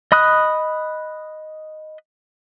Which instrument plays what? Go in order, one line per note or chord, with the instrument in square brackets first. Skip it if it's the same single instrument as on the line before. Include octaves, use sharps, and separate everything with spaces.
[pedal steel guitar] D#5 B5 D#6 F#6